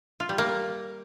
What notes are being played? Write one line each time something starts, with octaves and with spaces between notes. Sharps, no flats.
F4
G3
A#3